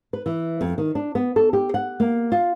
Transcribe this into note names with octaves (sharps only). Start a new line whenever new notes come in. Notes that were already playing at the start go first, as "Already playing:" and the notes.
B4
E3
F2
D#3
D4
B3
A4
G4
F#5
A#3
F4